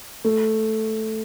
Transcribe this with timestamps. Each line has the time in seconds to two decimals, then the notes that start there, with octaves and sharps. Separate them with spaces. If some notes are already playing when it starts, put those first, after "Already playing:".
0.24 A3